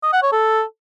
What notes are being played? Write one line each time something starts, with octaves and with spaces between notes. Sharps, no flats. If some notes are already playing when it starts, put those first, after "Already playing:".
D#5
F#5
C#5
A4